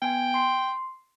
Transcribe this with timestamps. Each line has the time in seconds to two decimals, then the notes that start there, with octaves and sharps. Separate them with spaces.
0.02 B3 G5 G#5
0.34 C6 C7